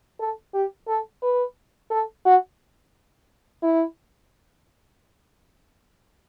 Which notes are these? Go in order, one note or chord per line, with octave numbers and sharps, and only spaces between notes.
A4
G4
A4
B4
A4
F#4
E4